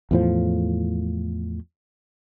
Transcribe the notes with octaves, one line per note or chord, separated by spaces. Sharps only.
E2 A2 F3